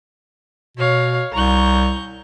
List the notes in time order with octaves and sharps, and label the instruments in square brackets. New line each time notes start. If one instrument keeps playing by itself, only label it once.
[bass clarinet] B2 [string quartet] C#5 F5
[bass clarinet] C2 [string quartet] A#5 C#6 G6